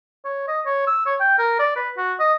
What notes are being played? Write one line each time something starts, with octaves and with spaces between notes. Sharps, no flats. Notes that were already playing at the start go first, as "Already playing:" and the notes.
C#5
D#5
C#5
E6
C#5
G5
A#4
D5
B4
F#4
D#5